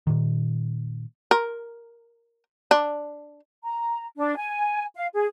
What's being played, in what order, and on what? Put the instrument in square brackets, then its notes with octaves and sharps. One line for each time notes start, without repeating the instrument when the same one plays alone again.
[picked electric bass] A#2 D#3
[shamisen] A#4
D4
[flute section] A#5
D4
G#5
F5
G#4